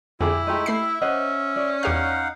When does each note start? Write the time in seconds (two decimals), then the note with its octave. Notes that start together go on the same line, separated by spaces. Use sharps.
0.20 F2 B2 D3 E4 G4 G#4 G5
0.47 G#3 A3 D#4 G4 D#5
0.66 A3 E5 B5 C7
1.01 C#4 C5 D#5 F#5
1.56 D5
1.83 E2 D#4 G4 F5 F#5 F6